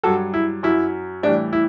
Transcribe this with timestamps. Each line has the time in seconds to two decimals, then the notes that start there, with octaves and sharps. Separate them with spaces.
0.03 G2 F#3 F#4 A4
0.34 E4
0.63 F#2 F#3 E4
1.23 A2 E3 G3 D4
1.53 E4